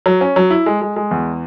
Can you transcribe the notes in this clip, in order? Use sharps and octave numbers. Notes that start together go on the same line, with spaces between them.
F#3
C#4
F#3
E4
G#3
G#3
G#3
E2